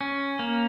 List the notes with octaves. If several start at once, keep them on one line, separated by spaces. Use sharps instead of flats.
C#4
A#3